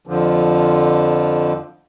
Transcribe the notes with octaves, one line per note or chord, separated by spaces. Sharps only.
F2 D3 F3